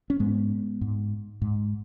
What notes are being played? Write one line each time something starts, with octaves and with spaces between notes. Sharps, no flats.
C#4
G#2 G#3 B3
G#2
G#2